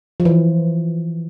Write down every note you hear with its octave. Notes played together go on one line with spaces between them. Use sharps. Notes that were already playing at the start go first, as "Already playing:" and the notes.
F3
E3